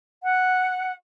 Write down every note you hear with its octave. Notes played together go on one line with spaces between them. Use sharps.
F#5